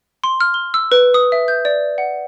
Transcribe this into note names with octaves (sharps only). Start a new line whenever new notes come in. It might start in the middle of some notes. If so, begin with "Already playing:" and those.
C6
F6
G7
E6
B4
D#6
E5
G6
D5
F#5